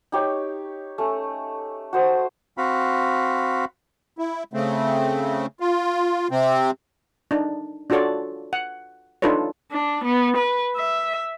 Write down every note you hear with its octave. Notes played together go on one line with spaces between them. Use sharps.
D#4 G4 C#5
A3 C#4
F#4 C5 D#6
C4 F#4 F5 B5
E4
C#3 A3 C4
F4
C3 C4
D4 D#4
D4 F4 F#4 A4 C#5 D5
F#5
D4 D#4 F4 A4 B4 C#5
D4
B3
B4
E5